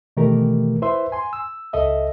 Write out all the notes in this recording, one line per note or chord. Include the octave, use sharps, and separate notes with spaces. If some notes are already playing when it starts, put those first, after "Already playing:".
B2 D#3 E3 A3 G4 A#4
E4 B4 C5 E5 C6
G#5 C6
E6
C#2 A4 D#5 E5